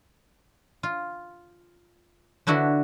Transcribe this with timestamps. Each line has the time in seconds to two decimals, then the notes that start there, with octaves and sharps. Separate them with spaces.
0.83 F4
2.47 D3 D4 E4 F#4 B4